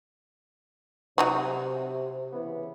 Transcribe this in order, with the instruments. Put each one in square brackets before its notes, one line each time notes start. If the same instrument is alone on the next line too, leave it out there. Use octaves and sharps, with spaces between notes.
[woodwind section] C3 [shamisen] F#3 D#4 F#4
[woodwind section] C#3 E3 B3